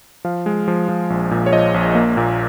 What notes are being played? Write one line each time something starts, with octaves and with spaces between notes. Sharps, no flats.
F3 F5
G#3
F3
F3
A#1
A#2
C#5
F3 D#5
A#1
A#3
A#2